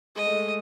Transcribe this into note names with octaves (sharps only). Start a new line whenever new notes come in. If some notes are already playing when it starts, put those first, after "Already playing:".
G#3 D#5
A3
G#3